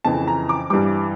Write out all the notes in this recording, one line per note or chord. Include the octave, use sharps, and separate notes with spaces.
F2 C#3 E3 A5
A#5
D6
G2 E3 G3 D6